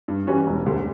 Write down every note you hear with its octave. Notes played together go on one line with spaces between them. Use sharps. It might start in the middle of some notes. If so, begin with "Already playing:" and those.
G2
E3 G3 C#4 F#4
E1
D2 D3 G3